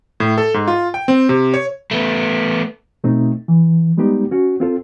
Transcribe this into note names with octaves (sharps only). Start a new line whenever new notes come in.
A2
A4
G#2
F4
G5
C4
C3
C#5
A3 B3
B2 A3 C4 D#4
E3
G3 G#3 B3 D#4 G4
C#4 F#4
C4 F4 A4